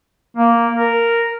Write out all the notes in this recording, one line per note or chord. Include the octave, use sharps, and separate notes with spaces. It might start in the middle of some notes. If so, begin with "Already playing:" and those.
A#3
A#4